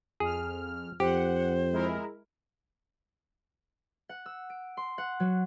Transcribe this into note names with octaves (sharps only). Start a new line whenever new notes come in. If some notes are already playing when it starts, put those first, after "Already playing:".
F2 G#4 F6
F2 G4 C5 F#5
G#3 E4 A#4
F#5
E6
D7
C6
F#5
F#3